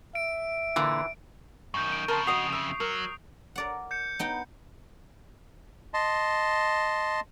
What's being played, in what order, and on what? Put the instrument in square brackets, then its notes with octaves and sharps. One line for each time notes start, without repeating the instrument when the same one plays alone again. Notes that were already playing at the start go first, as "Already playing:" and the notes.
[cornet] E5 [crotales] D7
[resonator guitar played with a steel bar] A#2 D3 [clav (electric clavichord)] E3
[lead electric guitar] F#2 D#3 [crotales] C#6 G6
[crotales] D7
[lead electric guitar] F2 C#3 [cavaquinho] A#4 A5 C6
[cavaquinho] F#4 D#5 [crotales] D#6 C7 F7
[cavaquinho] E5
[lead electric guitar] F#3 [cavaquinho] A#4
[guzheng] A#4 D5 F#5
[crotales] G6 C#7
[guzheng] B3 D#4 G5
[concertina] D#5 A5 C6